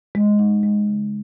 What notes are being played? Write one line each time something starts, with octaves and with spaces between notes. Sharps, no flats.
G#3
D#4
G#3
C#3